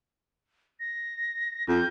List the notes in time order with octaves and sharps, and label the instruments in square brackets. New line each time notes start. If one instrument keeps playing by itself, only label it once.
[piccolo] A#6
[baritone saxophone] F2 [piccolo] G6